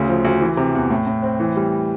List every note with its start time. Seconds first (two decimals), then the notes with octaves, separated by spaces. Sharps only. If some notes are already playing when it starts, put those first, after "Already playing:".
Already playing: D2 C#3
0.09 F3
0.25 D2
0.41 E3
0.57 C3
0.75 E2
0.90 A2
1.07 A2
1.23 C4
1.40 E3
1.56 G3